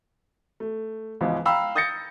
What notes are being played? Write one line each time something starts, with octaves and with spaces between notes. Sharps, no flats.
A3
C#2 G#2 E3 F3 B3
F5 G5 A#5 B5 E6
D#6 G6 A6 A#6 C#7